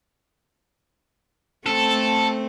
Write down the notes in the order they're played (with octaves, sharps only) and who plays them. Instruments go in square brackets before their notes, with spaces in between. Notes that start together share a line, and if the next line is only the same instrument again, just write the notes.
[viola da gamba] A3 C4 [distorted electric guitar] A4